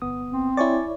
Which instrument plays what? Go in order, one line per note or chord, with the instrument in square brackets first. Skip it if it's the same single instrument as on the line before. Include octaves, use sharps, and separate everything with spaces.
[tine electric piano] G1 B3 D#6
[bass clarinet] C4
[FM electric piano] E4 C#5 D5 [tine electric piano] G#5 C#6 A6